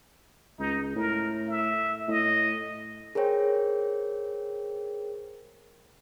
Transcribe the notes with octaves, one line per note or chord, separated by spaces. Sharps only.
C#2 D#4
A2 A#4
E5
A2 D#5
G#4 A#4 C5 C#5 G5